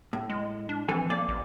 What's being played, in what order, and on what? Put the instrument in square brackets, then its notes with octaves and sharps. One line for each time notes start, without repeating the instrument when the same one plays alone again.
[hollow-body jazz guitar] A2
[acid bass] G#3
D4
[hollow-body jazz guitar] F2 A4 G#5 [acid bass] E3
[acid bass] A#3 [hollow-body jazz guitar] D5
[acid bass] A1